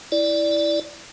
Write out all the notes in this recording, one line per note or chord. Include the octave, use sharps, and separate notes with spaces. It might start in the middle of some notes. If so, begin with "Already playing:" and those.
E4 D5